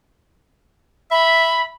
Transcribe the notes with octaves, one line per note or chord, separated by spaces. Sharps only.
E5 B5